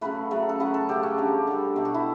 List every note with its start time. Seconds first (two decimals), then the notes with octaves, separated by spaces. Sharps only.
0.01 C#3 F#3 A3 B4
0.31 C#3 F#3 A3
0.49 A4
0.60 C#3 F#3 A3 B4
0.74 A4
0.89 C#3 F#3 A3 G4
1.03 C#4
1.18 D3 G3 G4
1.47 D3 G3
1.76 B2 F#3 A3 G4
1.85 F#4
1.94 E4